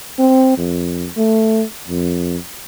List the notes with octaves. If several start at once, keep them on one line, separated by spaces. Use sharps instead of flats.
C4
F2
A3
F2